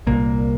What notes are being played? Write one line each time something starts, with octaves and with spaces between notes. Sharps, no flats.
C2 A#2 A#3